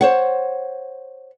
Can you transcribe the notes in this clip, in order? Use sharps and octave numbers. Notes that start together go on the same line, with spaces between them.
C5 C#5 F#5